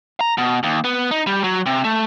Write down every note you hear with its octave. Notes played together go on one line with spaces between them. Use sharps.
A#5
B2
D#2
B3
D#4
G3
F#3
C3
A3